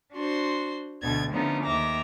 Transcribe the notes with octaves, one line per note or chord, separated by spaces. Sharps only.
D4 F#4 C5 C6
D2 B2 A3 G#6 A6
D3 F3 A3 B3 C#4 D#4
D#2 E5 A#5 D6